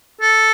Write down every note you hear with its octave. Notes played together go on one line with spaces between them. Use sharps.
A4